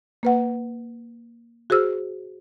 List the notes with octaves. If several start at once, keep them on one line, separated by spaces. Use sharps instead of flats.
A#3 B4 F#5
F#4 G#4 C5 E6 F6